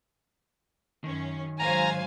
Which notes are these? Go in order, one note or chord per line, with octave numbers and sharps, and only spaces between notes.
F#2 D#3 C#4
G#2 F#3 C5 F5 G#5 A#5